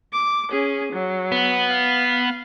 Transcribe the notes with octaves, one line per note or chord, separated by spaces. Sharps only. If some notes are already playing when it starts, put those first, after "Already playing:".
D6
C#4 G#4
F#3
B3
F5